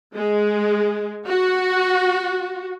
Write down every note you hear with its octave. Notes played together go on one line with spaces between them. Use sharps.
G#3
F#4